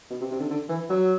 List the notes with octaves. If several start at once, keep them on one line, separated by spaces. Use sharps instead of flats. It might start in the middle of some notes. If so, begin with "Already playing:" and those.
B2
C3
C3
D3
D3
E3
F#3